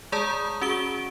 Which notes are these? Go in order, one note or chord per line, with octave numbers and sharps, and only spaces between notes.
G#3 G#4 D5 A5 A#5 D#6
C#4 F#4 G#4 D7 G7